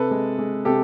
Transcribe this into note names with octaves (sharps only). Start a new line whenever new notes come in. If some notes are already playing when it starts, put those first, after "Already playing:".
Already playing: C3 A4 B4
G#3
G#3
C3 G4 A4